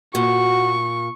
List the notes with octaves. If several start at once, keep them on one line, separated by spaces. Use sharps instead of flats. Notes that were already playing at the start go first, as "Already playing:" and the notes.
A#2 F#4 C#6